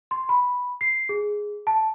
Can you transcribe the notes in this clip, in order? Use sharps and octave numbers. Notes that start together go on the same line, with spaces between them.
C6
B5
C7
G#4
A5